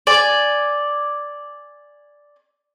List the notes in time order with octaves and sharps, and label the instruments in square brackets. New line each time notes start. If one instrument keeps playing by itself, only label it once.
[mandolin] D5 G#5